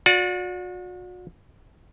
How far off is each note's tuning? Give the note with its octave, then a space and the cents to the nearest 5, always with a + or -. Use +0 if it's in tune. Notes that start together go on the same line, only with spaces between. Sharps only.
F#4 -40 D5 -10